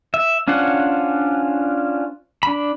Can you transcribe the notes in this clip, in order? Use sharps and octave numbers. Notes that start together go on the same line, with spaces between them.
E5
C#4 D4 F4 C5 F#5
D4 B5